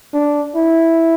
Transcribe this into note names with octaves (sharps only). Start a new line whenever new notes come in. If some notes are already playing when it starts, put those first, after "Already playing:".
D4
E4